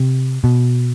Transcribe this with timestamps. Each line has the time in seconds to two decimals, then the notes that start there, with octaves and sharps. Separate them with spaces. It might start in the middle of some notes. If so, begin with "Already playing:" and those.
Already playing: C3
0.44 B2